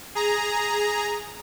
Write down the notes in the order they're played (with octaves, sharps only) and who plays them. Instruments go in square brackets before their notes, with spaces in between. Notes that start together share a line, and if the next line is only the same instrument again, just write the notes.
[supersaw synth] G#4 A#5